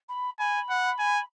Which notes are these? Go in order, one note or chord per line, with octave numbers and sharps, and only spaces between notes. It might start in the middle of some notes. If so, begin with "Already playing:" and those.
B5
G#5 B5
F#5
G#5